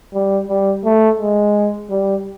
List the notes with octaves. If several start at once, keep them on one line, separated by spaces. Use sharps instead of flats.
G3
G3
A3
G#3
G3